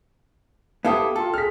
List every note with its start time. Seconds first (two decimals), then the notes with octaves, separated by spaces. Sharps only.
0.85 B3 E4 G4 A4 F5 G5 D#6
1.16 F4 A4
1.34 G#4 F6 B6